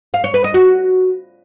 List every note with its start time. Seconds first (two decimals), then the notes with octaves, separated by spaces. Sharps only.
0.14 F5
0.24 C#5
0.34 B4
0.44 D#5
0.54 F#4